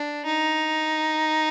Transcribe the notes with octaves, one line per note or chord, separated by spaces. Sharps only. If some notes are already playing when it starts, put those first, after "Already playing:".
Already playing: D4
D#4